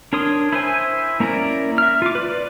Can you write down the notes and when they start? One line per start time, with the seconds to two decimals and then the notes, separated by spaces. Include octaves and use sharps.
0.13 D4 A#4 C#5 C6 D#6
0.53 E4 C5 G#5
1.20 A#3 C#4 E4 A#4 D5
1.78 E5 F6
2.02 F4 D6
2.15 B4 D5